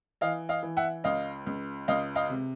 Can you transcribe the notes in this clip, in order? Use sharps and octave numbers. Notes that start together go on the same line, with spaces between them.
E3 D#5 F5
D#5 F5
E3
E5 F#5
C#2 D#5 F5
C#2
C#2 D#5 F5
D#5 F5
C3